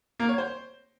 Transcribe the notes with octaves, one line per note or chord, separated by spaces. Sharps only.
A#3
C#5
C5